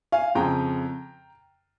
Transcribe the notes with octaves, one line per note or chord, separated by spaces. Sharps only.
F5 G#5
F2 C#3 F3 G5 A#5